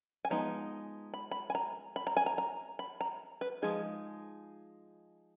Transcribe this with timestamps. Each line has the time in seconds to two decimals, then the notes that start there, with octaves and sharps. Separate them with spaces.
0.25 G#5
0.30 F3 G#3 B3 D#4 A#5
1.14 B5
1.31 B5
1.50 G#5
1.55 A#5
1.96 B5
2.07 A#5
2.17 G#5
2.26 A#5
2.38 A#5
2.79 B5
3.01 A#5
3.41 B4
3.62 F3 G#3 D#4 G#4